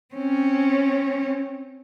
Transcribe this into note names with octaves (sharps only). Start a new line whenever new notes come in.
C4 C#4